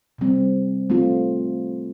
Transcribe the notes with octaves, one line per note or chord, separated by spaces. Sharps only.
C3 G3 C4
A3 C4 F4